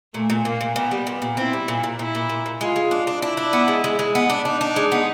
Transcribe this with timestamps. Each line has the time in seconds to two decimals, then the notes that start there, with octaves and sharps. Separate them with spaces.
0.14 A#2 A3
0.30 A#2
0.45 A#2 A#3
0.61 A#2
0.76 A#2 B3
0.91 G3
1.07 A#2
1.22 A#2
1.37 C4 E4
1.53 G3
1.68 A#2
1.83 A#2
1.99 A#2 E4
2.15 A#2
2.29 A#2
2.46 A#2
2.61 G#3 F4
2.76 G#3
2.91 D4
3.07 D4
3.22 D4 E4
3.37 D4
3.53 B3
3.68 G#3
3.84 G#3
3.99 G#3
4.15 B3
4.30 D4
4.45 D4 D#4
4.61 D4
4.76 G#3
4.92 B3